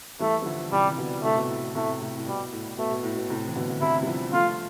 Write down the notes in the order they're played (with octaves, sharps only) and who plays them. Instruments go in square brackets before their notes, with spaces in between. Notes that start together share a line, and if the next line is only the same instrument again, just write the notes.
[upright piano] E3 G3 [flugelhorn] A3
[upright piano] G3
D3 F3
[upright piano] C3 E3 [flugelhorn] G3
[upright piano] E3
B2 D3
[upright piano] A2 C3 [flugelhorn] A3
[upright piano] B2
A2
[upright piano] A2 C3 [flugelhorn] A3
[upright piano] A2 C3
A2
[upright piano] B2 [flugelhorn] G3
[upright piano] A2
[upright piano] B2 [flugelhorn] A3
[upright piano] B2
A2
B2
A2 C3
E3
B2 D3
D3
[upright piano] C3 E3 [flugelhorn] E4
[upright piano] G3
D3 F3
[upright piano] F3 A3 [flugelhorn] F4